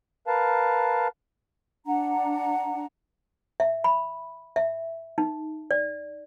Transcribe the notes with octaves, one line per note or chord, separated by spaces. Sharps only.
A#4 B4 F5 A5
D4 F#5 A#5
E5
B5
E5
D#4
D5